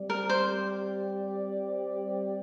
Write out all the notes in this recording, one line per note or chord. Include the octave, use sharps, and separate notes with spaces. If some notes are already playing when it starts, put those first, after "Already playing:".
Already playing: G3 C4 G4 D5
A#4
C5